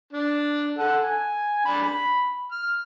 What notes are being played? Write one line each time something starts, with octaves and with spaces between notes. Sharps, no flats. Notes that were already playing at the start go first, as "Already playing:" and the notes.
D4
A4 F#5
G#5
D4 B5
B5
F6